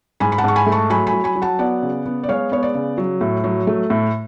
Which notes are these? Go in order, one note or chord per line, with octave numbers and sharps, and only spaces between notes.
G#2 G#5 B5
B5
F#5 A5
G#2 C#6
G#5 B5
A3
A5 C#6
F#3 G#5 B5
G#5 B5
F#3
G#5 B5
F#3
F#5 A5
B3 D5 F#5
C#3
B3
D5
G#3 C#5 F5
B3 C#5
D5
C#3
F#3
A2
F#3
A3
A2